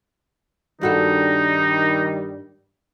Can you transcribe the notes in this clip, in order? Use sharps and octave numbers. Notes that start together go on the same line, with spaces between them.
G2 D#3 G3 D#4 F#4 A4